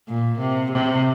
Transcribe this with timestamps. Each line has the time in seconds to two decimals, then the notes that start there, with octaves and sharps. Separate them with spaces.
0.08 A#2
0.39 C3
0.71 C3